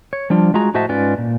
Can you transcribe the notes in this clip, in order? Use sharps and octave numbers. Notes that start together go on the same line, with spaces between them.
C#5
F3 G3 D4 F4
G#3 F4 F#4 G#4 A#5
A2 F#4 C5 D#5 E5 A5
G#2 C#4 F4 B4 D5
A#2